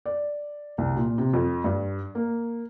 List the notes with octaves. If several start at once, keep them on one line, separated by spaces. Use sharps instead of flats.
D5
C2
A#2
C3
F2
G2
A#3